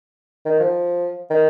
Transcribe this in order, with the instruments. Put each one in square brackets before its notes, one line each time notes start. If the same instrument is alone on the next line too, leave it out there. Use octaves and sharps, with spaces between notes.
[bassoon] D#3
F3
D#3